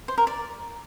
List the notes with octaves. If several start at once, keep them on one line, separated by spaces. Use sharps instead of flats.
C5
A#4
D5